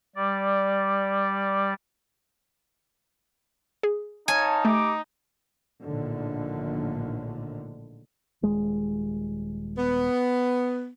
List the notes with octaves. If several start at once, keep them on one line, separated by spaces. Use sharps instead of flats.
G3 D5
G#4
D#4 C#5 F5 G#5 A5
A3 G4 B5 D6
A#1 A2 D3 D#3
D#1 G#3
B3